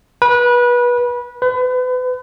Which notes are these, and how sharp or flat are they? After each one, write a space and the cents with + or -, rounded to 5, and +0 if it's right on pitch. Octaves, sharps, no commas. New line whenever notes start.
B4 -25
B4 +35